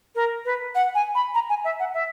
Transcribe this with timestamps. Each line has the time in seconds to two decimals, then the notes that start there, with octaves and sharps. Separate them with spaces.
0.15 A#4
0.45 B4
0.75 F#5
0.95 G#5
1.15 B5
1.34 A#5
1.49 G#5
1.64 E5
1.79 F#5
1.94 E5